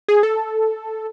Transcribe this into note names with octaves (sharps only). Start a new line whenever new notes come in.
G#4
A4